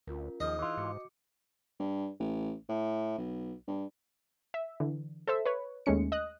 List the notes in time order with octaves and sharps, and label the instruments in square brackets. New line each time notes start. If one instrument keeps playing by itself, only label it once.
[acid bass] D2 [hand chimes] C#4 F4 A#4
[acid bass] D#2 [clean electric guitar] F3 [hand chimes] D#4 G#4 [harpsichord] D#5
[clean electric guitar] E3 F4
[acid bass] G#2 [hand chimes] F#4 D6 C#7
[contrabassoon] G2
A1
A2
B1
G2
[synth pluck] E5
D3 E3
A4 C5 E5
B4 C#5
D#2 G#3 A3 C#4 C#7
D#5 D#6 F#6